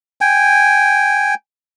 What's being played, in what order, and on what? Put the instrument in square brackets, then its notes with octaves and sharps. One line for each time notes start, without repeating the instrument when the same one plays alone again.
[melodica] G5 G#5